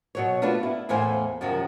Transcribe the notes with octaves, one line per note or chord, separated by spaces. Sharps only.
B2 F#3 C#5
A3 B3 D4 F4 F#4
E4
E2 A2 A3 C5 F5 G#5
F#2 C3 D#3 F3